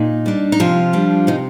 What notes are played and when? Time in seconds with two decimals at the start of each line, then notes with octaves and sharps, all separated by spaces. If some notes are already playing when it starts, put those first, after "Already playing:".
Already playing: A#2 D#4
0.26 G3 D4
0.52 D#4
0.60 C3 F3 F4
0.93 G3 D4
1.27 C3 D#4